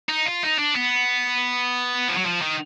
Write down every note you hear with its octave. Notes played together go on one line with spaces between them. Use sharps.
D#4
F4
D#4
D4
B3
F3
F#3
F3
D#3